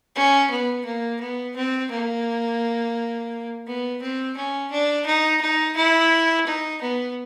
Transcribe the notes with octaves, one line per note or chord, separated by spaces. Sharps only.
C#4
B3
A#3
B3
C4
A#3
B3
C4
C#4
D4
D#4
D#4
E4
D#4
B3